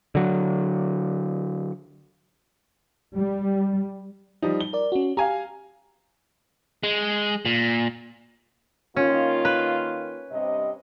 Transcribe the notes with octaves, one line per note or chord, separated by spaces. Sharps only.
D3 F#3
G3
F3 G3 D#4
G7
A#4 D5
C#4 F#4
G4 F5 G#5 A#5
G#3
A#2
D#3 A#3 C#4 F4
B4
G2 C3 D#5